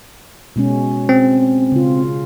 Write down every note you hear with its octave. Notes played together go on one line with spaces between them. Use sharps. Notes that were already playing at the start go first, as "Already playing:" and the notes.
B2 G#3 C#4
C4
C#3 F4